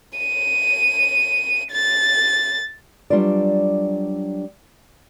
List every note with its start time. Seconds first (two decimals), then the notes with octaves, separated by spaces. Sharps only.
0.18 D#7
1.71 A6
3.10 F#3 G3 D4 F4 B4 D5